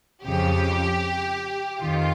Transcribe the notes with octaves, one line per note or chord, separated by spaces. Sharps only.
F2 C#3 F3 G4
F2 D#3 F4